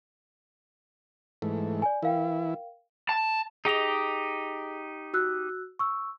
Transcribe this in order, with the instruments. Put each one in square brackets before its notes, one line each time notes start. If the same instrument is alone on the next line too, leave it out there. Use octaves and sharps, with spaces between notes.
[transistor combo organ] G#2 E3 A3
[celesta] D5 G#5
[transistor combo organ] E3 E4 [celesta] A#4 F5 G5
[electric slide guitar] A5
[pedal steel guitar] D#4 G4 D#5 [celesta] G#4 F7
[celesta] F#4 E6 F#6
C#6 E6